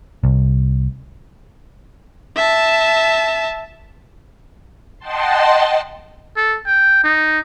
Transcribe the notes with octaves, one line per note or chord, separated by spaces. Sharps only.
C2
E5 A5
D#5 F#5 G5 A5 C6
A4
G5
D#4